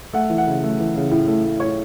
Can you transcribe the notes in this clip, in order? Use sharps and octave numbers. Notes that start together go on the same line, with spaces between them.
A3 F#5
E3
F#5
C#3
A3
E3
C#3
A2
A3
A3
A2 C#5